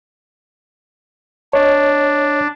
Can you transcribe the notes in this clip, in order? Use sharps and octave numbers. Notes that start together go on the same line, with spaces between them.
D4 C#5 D#5